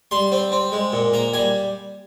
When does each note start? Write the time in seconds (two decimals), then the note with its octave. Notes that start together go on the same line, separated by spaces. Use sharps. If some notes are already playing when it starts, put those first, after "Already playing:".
0.11 G3 C6
0.32 C4
0.52 C4
0.72 G#3
0.92 A#2
1.13 A#3 A#5
1.34 G3 G#5